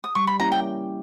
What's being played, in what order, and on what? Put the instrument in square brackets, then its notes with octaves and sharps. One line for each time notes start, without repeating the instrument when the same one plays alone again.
[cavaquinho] D#6
[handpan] G3 [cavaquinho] C#6
[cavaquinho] B5
[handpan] A#3 C#4 E4 G4 [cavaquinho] A#5
[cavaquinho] G5